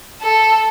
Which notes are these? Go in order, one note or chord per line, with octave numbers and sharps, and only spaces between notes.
A4